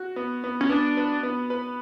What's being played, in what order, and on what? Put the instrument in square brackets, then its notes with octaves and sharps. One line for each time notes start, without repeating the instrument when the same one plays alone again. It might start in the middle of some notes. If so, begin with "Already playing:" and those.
Already playing: [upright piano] F#4
B3
B3
[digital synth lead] C#4
[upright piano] B3 [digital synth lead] D4
[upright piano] B4
B3
B4